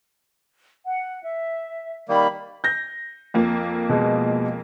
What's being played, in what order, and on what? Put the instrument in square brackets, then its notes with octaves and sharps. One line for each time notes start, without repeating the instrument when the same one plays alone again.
[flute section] F#5
E5
[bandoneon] D#3 G3 A#3 [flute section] B5
[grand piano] G6 A#6
[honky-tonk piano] F2 A#3
[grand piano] B2 G#3